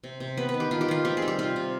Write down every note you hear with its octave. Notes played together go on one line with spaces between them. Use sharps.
C3
C3
B3 B4
B4
D#3
G4
D#3 F4
G4
D#3 F4
C4 G4
G#4
G3
G4
C3 F4
C3